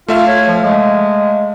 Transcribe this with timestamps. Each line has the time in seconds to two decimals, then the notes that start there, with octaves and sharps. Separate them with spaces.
0.08 A3 F4 E5 F5
0.27 C#5
0.48 F3
0.64 G#3